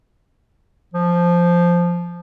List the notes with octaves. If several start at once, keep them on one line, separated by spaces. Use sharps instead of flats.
F3